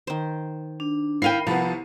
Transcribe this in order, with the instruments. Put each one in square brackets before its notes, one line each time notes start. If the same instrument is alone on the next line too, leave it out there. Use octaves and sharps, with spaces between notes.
[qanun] D#3 C5
[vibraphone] D4
[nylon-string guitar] E4 F5 G5 [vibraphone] A#4 B5 [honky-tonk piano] C7 D#7
[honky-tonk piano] C2 B3 [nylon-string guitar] F3